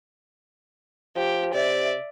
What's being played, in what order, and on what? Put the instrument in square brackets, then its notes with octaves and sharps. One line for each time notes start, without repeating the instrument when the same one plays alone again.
[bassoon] F3 [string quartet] G4
[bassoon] C3 [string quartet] D5 E5